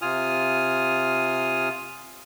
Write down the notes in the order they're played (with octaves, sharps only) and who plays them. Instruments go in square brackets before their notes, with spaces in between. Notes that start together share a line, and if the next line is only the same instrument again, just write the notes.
[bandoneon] C3 F4 G#5 D#6 F6